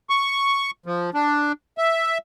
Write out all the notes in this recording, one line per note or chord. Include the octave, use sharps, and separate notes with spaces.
C#6
F3
D4
E5